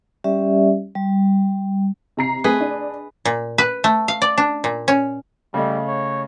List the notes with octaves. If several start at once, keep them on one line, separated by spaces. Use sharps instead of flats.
G3 C#4 G4 D5 E5
G3
C3 A#5 C7
A3 C4 G#4 B4 D#5
D4
A#2
B4
A3
F5
D5
D4
A#2
C#4
C#3 G3 A3 D#5
C#5